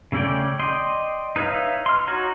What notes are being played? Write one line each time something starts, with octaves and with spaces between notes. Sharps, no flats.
C#3 A3 C#4 D5 G5
D5 D#5 G5 C6
D#4 B4 C#5 E5 F5
C6 F6
D#4 F#4 C#5 A#5